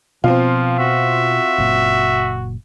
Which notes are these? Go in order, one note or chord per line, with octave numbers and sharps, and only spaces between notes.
B2 F3 B3 C4 F4
F#4 E5
F#1 A#2